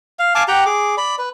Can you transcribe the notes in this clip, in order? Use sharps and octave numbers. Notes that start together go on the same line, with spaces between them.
F5
F5 G#5 A5 D6
G4 F#5 G5 A#5
G#4 D6
D5 B5
B4